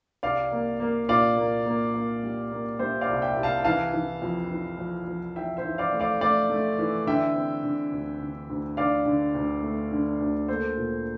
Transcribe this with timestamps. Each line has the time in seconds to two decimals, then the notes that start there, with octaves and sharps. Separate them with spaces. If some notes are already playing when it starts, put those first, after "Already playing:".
0.23 C2 D5 F5
0.52 A#3
0.80 A#3
1.09 A#2 D5 F5
1.37 A#3
1.66 A#3
1.94 A#3
2.23 G3
2.52 A#3
2.79 G3 C5 E5
3.01 D5 F5
3.09 C2
3.22 E5 G5
3.37 C2
3.43 F5 A5
3.65 E3 F5 A5
3.93 E3
4.22 F2
4.51 E3
4.79 F2
5.07 F2
5.36 E3 E5 G5
5.57 C5 E5
5.65 E3
5.78 D5 F5
5.93 A3
6.00 D5 F5
6.21 A3 D5 F5
6.50 A3
6.79 E3
7.06 D3 E5 G5
7.35 C4
7.63 D3
7.92 D2
8.21 D3
8.50 D2
8.77 D3 D5 F5
9.06 D3
9.34 D2
9.63 A3
9.92 D3
10.20 D2
10.48 A#3 A4 C5
10.77 A#2